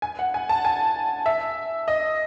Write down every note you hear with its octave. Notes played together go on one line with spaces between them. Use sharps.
G#5
F#5
G#5
A5
G#5
E5
D#5